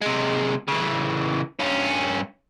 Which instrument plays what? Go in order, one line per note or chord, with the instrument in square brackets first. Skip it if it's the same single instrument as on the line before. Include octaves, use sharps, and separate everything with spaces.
[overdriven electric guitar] C3 G#3
C#3 E3
G2 C#4